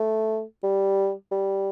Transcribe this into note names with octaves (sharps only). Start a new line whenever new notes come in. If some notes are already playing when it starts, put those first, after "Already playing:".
Already playing: A3
G3
G3